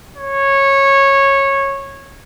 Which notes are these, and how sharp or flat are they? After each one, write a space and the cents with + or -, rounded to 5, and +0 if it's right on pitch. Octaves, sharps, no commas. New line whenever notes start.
C#5 -15